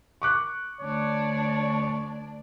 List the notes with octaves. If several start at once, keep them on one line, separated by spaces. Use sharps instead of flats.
C#6 D6 F#6
D2 D4 C#5 D5